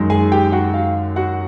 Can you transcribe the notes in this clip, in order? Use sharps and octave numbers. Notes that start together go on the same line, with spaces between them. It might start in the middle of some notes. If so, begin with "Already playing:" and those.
Already playing: F#2 D#3 G#3
G#4 G#5
G4 G5
F#4 F#5
F5
F#4 F#5